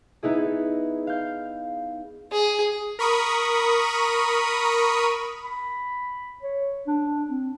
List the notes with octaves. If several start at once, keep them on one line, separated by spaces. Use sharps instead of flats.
B3 D#4 E4 G#4
F5 G6
G#4
A#4 B5 C#6 D#6
B5
C#5
D4
C4